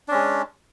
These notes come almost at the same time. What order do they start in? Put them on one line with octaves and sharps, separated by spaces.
D4 C#4 G#3